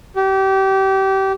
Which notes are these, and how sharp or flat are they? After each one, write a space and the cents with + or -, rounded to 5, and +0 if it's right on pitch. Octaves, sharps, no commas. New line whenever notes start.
G4 -30